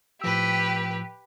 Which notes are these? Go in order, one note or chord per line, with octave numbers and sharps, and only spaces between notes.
A2 F3 G4 B4 E6